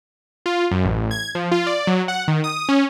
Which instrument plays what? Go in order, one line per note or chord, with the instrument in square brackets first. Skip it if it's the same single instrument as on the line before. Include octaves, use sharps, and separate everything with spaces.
[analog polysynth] F4
F#2
A1
G#6
F3
F4
D5
F#3
F#5
D#3
D#6
C#4